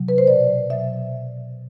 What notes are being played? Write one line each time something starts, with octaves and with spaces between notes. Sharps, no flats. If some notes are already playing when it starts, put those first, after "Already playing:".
Already playing: C3 F#3
B4
C5
B2 F#3 D5
B2 F#3 E5